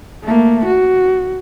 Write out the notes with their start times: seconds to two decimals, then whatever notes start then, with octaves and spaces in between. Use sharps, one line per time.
0.24 A3 A#3
0.65 F#4